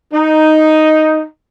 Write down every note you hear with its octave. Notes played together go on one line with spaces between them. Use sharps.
D#4